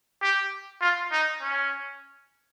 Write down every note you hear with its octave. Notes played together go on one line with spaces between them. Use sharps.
G4
F4
D#4
C#4